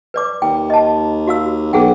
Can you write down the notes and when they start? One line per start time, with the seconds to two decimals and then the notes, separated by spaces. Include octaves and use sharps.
0.14 B4 D5 D6
0.42 D#2 G5
0.70 D#5 A5
1.27 F#4 F5 E6
1.73 B1 G#4 F#5 G5